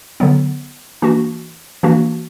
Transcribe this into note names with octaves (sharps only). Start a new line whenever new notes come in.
D3 F#3 B3
E3 A#3 D4 F#4
E3 A#3 D4 F#4